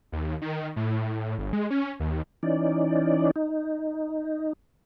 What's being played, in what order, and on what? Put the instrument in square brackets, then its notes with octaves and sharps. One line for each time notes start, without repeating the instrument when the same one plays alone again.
[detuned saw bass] D#2
D#3
A2
G1
G#3
C#4
D#2
[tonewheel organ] E3 C#4 D#4 D5
D#4